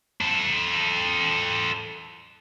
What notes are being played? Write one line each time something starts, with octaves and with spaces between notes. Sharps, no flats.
A4 C5